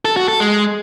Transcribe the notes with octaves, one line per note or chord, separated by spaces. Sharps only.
A4
F#4
A4
G#3